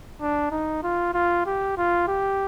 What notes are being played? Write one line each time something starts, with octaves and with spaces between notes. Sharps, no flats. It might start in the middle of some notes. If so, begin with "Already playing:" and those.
D4
D#4
F4
F4
G4
F4
G4